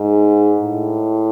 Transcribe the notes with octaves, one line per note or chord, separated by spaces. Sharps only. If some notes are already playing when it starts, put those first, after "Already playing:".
Already playing: G#2
A2